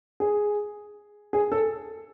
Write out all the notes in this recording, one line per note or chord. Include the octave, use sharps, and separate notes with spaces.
G#4
G#4
A4